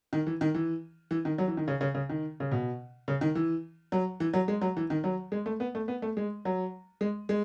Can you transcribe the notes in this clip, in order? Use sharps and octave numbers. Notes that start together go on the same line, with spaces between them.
D#3
E3
D#3
E3
E3
D#3
F#3
E3
D#3
C#3
C#3
C#3
D#3
C#3
B2
C#3
D#3
E3
F#3
E3
F#3
G#3
F#3
E3
D#3
F#3
G#3
A3
B3
A3
B3
A3
G#3
F#3
G#3
G#3